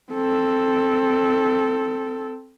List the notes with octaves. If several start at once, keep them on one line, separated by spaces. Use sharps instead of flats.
C4 A4